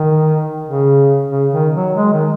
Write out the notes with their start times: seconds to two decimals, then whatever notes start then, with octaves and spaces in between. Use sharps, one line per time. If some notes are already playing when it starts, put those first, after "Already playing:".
Already playing: D#3
0.65 C#3
1.31 C#3
1.53 D#3
1.75 F#3
1.96 G#3
2.13 D#3